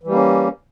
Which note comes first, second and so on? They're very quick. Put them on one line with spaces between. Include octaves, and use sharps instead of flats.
E3 G3 A#3 C#4